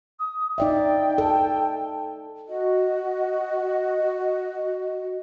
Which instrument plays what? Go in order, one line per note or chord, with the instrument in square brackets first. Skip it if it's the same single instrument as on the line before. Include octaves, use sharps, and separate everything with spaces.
[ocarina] D#6
[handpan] D#4 D5 E5 [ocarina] G5
[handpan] A4
[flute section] F#4 D#5